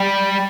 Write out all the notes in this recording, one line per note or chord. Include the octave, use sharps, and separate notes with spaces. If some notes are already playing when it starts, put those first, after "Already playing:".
Already playing: G3